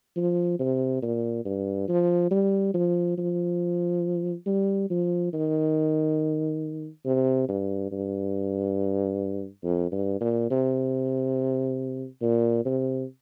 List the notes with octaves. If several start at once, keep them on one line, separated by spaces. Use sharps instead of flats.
F3
C3
A#2
G2
F3
G3
F3
F3
G3
F3
D#3
C3
G2
G2
F2
G2
A#2
C3
A#2
C3